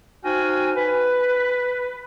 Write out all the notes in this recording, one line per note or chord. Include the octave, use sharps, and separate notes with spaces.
D#4 F#4 C5 F5 G5 G#5
B4